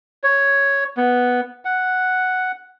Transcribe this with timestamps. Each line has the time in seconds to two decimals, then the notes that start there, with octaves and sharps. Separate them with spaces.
0.23 C#5
0.97 B3
1.65 F#5